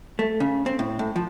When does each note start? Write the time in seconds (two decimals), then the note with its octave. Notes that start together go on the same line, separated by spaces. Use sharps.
0.19 A3
0.40 C#3
0.66 C4
0.79 A2
0.99 A2
1.16 F3